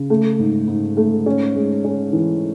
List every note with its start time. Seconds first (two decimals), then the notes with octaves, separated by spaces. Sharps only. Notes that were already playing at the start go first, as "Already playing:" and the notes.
Already playing: C#3
0.10 A3
0.39 G#2
0.68 G#2
0.97 A3
1.26 C#4
1.55 G#3
1.85 C#4
2.13 E3